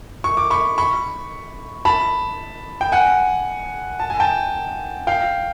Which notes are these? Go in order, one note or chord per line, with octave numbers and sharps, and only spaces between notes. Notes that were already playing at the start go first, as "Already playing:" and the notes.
C#6
D6
B5 C#6
B5 C#6
A5 B5
G5
F#5 G#5
A5
G#5
G5 A5
F5 G5